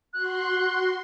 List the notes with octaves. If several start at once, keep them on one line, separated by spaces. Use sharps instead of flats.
F#4 C6 F#6